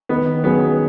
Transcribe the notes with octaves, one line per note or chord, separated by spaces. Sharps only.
D#3 B3
F#3 B3 C#4 G#4